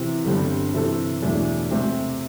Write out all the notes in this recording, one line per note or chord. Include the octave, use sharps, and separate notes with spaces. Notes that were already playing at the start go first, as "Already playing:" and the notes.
Already playing: C3 E3 C4
G1 G2 D3 G3 C4
C3 E3 C4 A4
E1 E2 E3 A3 D4
C3 A3 C4 G4